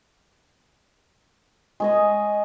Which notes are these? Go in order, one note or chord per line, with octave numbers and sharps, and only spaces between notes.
G#3 C#5 D#5